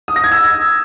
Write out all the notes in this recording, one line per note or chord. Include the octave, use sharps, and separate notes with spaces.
D#6
A#6
G#6
E6